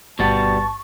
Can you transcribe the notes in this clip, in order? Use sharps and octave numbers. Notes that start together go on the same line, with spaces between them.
G1 B2 G3 B3 A5 C#6 A6